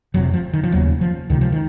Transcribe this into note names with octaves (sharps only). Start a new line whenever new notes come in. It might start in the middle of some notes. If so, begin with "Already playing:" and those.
F1 F2 C3 F#3
F3
D#3
F3
F1 D#2 C#3 F#3
F3
C#2 C3 D#3
F3
D#3